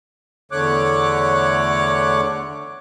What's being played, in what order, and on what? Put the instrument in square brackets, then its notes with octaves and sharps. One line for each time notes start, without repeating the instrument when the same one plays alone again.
[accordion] E2 D3 A3 C#5 D6 F#6